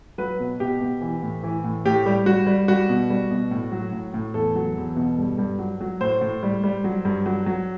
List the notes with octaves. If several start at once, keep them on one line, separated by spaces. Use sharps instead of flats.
F#3 B4
B2
B2 G4
B2
E3
A2
E3
A2
A2 G4
G3
G3 F#4
G3
G3 F#4
B2
G3
B2
A2
F#3
A2
A2
E2 A4
F#3
E2
B2
G2
G2
F#3
F#3
A2 C5
A2
G3
G3
F#3
G2
F#3
F#3